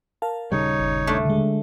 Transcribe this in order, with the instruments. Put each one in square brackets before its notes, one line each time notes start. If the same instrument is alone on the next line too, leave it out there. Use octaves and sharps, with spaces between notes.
[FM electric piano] A#4 F5 A5
[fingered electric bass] D#1 C#3 G3 [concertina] D#4 C#5
[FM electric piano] G1
[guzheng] A3 D4
[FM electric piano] D3 G#3